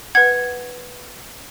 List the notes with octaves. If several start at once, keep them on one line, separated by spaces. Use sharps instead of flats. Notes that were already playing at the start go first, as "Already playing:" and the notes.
B4 F#5 G#6